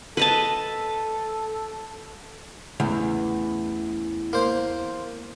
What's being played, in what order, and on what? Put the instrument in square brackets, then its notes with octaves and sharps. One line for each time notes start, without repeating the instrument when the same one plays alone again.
[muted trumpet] A4 [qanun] B4 D#5 A5
[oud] E2 [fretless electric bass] C#3 A3
[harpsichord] A#3 C5